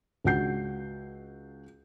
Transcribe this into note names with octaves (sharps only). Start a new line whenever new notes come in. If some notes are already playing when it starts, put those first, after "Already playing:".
C#2 D4 F#4 F#5 G6 C7